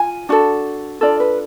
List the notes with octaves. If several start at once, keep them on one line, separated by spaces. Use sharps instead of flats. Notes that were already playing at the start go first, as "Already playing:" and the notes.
Already playing: F4 G#5
D4 F#4 A4
D4 F4 A4 D5
B4